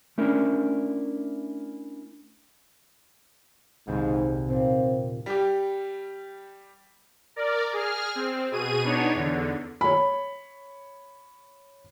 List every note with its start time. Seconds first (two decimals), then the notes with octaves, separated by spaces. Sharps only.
0.18 A3 C#4 D4 E4 A#4
3.87 D#1 C2 G#2 C4
4.50 A#2 C4
5.26 G3 G4
7.36 A#4 D5
7.73 G#4 F6
8.15 C4
8.51 B2 G#4 D#7
8.83 B3 D4 D#4 C#5
9.14 E2 D3
9.81 C#5 B5